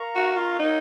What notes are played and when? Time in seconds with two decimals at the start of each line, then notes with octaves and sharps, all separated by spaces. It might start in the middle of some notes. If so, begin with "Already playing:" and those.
Already playing: A#4 F5 A#5 C#6
0.15 F#4
0.36 F4
0.59 D#4 A#4 C#5 F#5